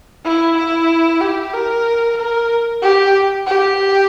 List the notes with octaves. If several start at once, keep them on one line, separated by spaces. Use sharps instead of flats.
E4
E4
G4
A#4
A#4
G4
G4